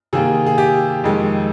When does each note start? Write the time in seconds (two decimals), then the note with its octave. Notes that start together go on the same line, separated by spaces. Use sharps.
0.13 C3 D#3 A#3 G#4
0.46 G#4
0.58 G4
1.04 F2 D#3 G#3